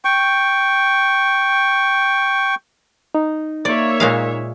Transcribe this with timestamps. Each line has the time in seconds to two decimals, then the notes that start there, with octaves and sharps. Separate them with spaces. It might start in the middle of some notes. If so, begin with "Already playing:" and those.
0.05 G5 C#6
3.15 D#4
3.65 A#3 C#5 D5 E5
4.00 A#2 G#3 F5